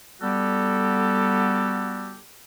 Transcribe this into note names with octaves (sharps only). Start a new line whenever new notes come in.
D3 G3 B3 F#4 G4 A4